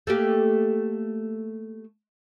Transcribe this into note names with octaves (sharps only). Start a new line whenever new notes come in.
A3 A#3 G4